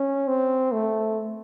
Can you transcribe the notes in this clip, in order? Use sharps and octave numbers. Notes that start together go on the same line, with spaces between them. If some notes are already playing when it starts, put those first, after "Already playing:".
Already playing: C#4
C4
A3